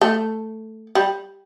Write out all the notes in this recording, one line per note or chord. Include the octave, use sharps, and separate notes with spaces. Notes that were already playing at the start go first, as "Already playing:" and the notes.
A3
G3